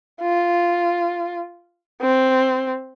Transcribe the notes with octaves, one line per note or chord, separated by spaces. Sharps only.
F4
C4